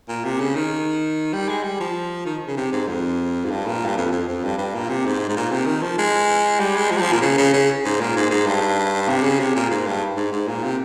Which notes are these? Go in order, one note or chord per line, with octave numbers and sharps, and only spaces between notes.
A#2
C3
C#3
D#3
G3
G#3
G3
F3
D#3
C#3
C3
G#2
F2
G#2
G2
A#2
G2
F2
F2
F2
G2
G2
A#2
C3
G#2
G#2
A#2
C3
D#3
F3
G#3
G3
G#3
F3
G3
F3
A#2
C#3
C#3
C#3
G#2
A#2
G#2
G#2
G2
C3
C#3
C3
A#2
G#2
G2
G#2
G#2
A#2
C3